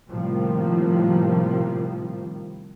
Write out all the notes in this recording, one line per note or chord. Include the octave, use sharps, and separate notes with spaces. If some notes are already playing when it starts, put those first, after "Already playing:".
A2 C3 D#3 F3 G3 A#3